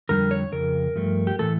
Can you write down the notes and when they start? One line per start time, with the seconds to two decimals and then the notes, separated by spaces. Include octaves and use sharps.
0.09 F2 D3 G3 A#4
0.31 C#5
0.52 F2 C#3 A#4
0.96 G2 F3 A3
1.27 G4
1.39 A2 E3 A3 A4